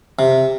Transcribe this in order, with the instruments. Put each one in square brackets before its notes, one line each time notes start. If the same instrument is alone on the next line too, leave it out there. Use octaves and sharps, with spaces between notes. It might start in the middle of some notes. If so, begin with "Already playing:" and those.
[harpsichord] C3